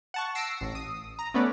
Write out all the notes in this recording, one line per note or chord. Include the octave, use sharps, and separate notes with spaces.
F#5 A5 C#6
E6 A#6 C7 D7
A1
D#6
A#5
A3 B3 C#4 B4 D5